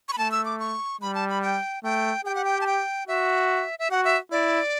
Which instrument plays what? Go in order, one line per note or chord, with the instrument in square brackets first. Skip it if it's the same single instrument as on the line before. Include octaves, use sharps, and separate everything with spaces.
[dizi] C#6
B5
[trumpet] A3 [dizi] A5
[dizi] E6
D6
C#6
[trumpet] G3 [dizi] B5
[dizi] A5
B5
G5
[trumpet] A3 [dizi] G5
[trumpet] G4 [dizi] G5
[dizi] F#5
G5
A5
G5
[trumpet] F#4 [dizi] E5
[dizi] E5
[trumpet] F#4 [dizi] F#5
[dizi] E5
[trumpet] E4 [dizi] D5